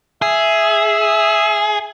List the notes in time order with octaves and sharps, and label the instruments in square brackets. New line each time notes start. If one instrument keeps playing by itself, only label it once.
[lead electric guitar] G#4 [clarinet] E5